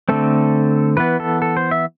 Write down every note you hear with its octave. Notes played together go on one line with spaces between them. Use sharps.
D3 A3 C4 A4
E3 B3 B4
A4
A4
C5
E5